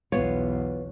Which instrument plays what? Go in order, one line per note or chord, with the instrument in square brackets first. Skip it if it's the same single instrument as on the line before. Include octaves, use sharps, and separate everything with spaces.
[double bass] B1 E2 [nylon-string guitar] B3 F4 [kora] C#5